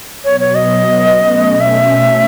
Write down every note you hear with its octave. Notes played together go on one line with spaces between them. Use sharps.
B2 F#3 B3 C#5
C#5
D#5
B2 A3 C#4
E5